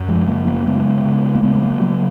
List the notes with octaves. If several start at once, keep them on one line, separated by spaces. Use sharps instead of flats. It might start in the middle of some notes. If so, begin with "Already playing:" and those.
Already playing: F#2
F3 G#3
C#3 F#3 A#3
F#3 A#3
C#3 G#3 B3
C#3
A#3
C#3 G#3 B3
G#3
F#3 A#3
C#3 F#3 A#3